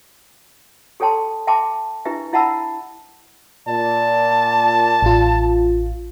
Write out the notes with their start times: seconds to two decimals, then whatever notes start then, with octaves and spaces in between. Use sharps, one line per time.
1.00 G4 A4 C#5 G5 A5 C6
1.47 E5 G5 A5 C6 D6
2.05 D4 E4 G4 B4 E5
2.33 E4 E5 F#5 A5 B5 E6
3.68 A#2 D5 A5
5.02 A1 F4